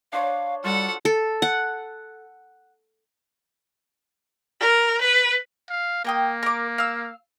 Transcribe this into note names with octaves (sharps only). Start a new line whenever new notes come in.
D4 C5 C#5 F5
G3 F4 F#4 A4 F#5
A4
F#5
A#4
B4
F5
A#3 A#4 G5 D#6
A#4 D6
F5 E6